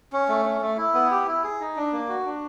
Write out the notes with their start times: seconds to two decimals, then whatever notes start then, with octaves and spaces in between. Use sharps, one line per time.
0.13 C#4
0.29 A3
0.45 C#4
0.61 A3
0.77 E4
0.94 B3
1.11 G4
1.27 E4
1.44 G#4
1.60 D#4
1.76 D4
1.92 A#3
2.09 F#4
2.26 D4